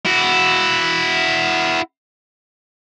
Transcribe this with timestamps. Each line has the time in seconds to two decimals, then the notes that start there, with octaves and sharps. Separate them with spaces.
0.05 E4 F#4